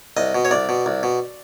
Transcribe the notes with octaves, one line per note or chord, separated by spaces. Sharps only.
C2 D#5
B2
C#5
C2 D5
B2
C2
B2